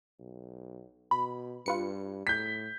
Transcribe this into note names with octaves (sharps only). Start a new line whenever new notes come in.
B1
B2 B5
G2 F4 B4 C#7
A2 G6 B6